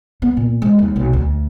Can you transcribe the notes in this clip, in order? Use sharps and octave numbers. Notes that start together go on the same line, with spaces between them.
B3
A#2
G#3
D#2
B1
D2